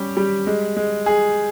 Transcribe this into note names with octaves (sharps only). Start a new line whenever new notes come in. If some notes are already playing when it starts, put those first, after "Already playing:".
Already playing: G3 C#4 G4
G3
G#3
G#3
G#4